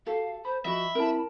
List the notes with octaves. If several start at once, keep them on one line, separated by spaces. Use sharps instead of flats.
F#4 G4 A4 F5
C5 B5
F3 F#4 D#5 E5 B5
C4 E4 A#4 A5